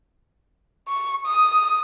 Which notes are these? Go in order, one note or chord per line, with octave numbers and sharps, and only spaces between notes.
C#6
D#6